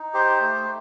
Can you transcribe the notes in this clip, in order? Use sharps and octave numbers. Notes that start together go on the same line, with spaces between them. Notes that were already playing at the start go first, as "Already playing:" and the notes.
Already playing: D#4
G4 C5
A3